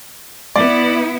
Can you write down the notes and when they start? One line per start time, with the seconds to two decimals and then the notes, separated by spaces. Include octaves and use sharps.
0.56 B3 E4 D5